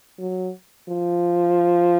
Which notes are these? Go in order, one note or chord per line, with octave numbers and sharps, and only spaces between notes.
F#3
F3